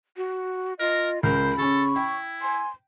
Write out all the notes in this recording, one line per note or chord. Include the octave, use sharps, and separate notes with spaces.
F#4
F4 A#4 D#5
C#2 A#4 C5 B5
C#3 C#4 A4 C#6
E4 G5
G#5 C6